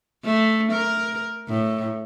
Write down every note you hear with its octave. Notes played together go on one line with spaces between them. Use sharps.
A3
A#4
A2